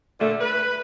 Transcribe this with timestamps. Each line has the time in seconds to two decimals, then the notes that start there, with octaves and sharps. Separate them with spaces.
0.20 A#2 D3 A3
0.41 B4